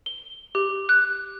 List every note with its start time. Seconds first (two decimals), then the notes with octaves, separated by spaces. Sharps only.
0.06 G7
0.55 G4
0.89 F#6